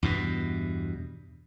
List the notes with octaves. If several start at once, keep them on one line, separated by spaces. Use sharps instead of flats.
E2 G2 B2